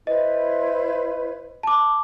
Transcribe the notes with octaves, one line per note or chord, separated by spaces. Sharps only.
E4 B4 C5 D#5
A5 D6